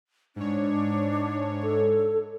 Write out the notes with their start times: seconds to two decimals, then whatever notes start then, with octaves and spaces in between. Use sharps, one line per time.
0.36 G#2 D4 C#5
1.63 A4